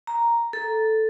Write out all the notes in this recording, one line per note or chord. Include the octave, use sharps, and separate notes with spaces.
A#5
A4